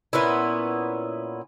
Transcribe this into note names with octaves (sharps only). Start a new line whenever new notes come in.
A#2 B3 C#4 E4